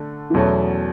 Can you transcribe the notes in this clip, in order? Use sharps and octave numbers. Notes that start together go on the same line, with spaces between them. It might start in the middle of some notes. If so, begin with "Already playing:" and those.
Already playing: D3 A3
E3
E2 B2 F#3 A3 C#4